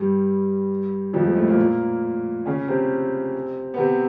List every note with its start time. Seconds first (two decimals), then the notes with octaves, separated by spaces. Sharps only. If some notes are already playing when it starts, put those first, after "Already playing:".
Already playing: G2 G3
1.13 F2 F3
1.26 G#3
1.36 A2 A3
1.47 A#2 A#3
2.46 C#3 C#4
2.68 C3 C4
3.74 B3
3.78 C3 C4